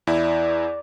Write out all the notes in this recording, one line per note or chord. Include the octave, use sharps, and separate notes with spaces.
E2 E4 D5